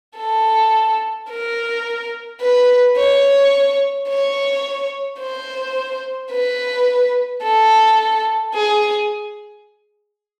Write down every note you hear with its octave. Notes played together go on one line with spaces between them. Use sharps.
A4
A#4
B4
C#5
C#5
C5
B4
A4
G#4